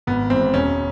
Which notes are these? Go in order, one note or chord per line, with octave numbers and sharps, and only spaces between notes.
G#1 B3
G#2 E3 C4
E1 C#4